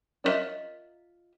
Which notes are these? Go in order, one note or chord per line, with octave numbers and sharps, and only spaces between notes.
D4 F4 A#4 D#5 E5